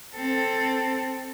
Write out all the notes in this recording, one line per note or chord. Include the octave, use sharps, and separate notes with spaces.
C4 A4